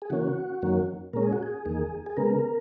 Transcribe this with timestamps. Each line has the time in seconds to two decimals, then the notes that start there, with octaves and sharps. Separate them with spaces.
0.02 G#4
0.10 C#3 E3 A#3 C#4 F#4
0.62 F#2 D#3 F#3 A#3 C#4
1.13 A#2 G#3 C#4 A#4
1.23 G#4
1.33 F#4
1.43 G#4
1.65 E2 D#3 A#3
2.06 G#4
2.17 C#3 G#3 B3 A#4